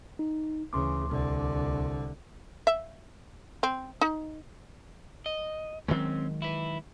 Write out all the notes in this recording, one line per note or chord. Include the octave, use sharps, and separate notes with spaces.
D#4
D2 C#3 E3 C6 D6
C2 D3
E5
C4
D#4
D#5
D#3 F#3 G#3 C4 C#4
E4 B4